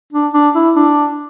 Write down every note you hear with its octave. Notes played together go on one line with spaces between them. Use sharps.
D4
D4
E4
D4